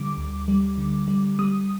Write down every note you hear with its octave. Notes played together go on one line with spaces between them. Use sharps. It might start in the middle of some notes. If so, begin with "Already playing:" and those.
Already playing: D3 G3 D6
D2
G3
D3
G3
G3 D#6